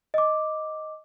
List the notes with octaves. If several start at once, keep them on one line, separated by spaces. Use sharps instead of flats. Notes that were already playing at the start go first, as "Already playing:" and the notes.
D#5 D6